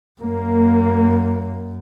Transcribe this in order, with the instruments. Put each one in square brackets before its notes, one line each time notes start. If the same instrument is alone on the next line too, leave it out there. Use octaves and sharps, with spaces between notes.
[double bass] F#2 [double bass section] A#3